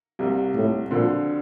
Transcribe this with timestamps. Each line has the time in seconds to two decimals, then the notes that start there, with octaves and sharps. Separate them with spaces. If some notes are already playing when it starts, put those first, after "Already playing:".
0.19 C2 C3 G3 A#3
0.55 A2
0.90 D2 A#2 D3 F3 C4